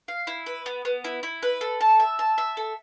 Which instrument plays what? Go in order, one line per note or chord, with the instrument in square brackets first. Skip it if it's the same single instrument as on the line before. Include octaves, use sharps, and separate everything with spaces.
[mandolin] F5
E4
B4
B3
B3
E4
E4
B4
A4
A5
E5
A5
E5
A4